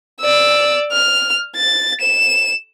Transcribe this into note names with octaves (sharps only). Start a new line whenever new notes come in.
D5 E6
F6
A6
E7